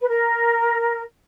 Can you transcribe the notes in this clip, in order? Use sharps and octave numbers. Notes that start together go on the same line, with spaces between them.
B4
A#4